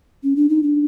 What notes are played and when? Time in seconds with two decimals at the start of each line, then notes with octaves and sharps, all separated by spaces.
0.23 C#4
0.36 D4
0.49 D#4
0.63 D4